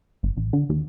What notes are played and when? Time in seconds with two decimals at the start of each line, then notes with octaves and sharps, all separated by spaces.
0.23 G1
0.37 A1
0.53 D3
0.69 D#2